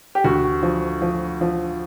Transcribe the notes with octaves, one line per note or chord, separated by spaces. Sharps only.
G4
D2 F#4
F3
F3
F3